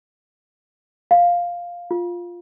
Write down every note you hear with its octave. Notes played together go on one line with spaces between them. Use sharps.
F5
F4